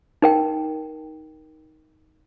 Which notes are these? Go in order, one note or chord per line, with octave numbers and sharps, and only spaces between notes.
D#4 A#4 G5